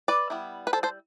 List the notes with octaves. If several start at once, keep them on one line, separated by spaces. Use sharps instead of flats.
B4 D5
G3 B3 E4
B4
A4 C5
A4 C5